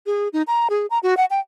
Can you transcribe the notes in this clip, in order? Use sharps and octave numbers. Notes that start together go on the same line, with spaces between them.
G#4
D#4
A#5
G#4
A#5
F#4
F#5
G5